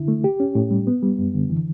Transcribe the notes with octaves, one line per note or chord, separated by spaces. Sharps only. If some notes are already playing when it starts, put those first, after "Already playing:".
Already playing: D3 E4
A3
G4
C#4
A2
G3
B3
G3
F#2
D3
E3